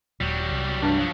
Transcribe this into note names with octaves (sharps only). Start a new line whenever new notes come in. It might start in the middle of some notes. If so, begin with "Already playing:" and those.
D#1 F#3 G3
C2
G2
F3 F#3